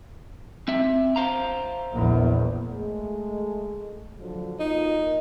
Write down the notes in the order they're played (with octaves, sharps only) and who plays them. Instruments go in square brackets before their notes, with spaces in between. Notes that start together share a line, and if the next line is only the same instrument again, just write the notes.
[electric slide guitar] C4 E5
C5 F5 A#5
[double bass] A#1 E2
[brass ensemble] G#3 A3
D3 F3 F#3
[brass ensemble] A#3 F4 [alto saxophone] D#4